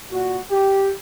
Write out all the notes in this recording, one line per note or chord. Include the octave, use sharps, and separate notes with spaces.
A#2 F#4
G4